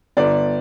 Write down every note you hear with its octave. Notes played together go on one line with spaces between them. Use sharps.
G1 D5